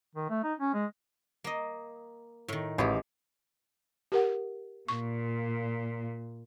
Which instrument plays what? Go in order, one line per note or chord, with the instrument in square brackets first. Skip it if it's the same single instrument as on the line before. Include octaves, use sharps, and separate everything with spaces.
[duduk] D#3
A3
D#4
C#4
G#3
[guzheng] A#3 D#5
A2 D#3
[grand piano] A1 [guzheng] G#3 G4
[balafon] G4 A#4 F#5
[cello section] A#2 [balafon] C#6